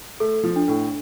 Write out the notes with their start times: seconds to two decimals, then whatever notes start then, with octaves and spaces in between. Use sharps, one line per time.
0.20 A3 A4
0.44 F3
0.56 D4
0.68 A2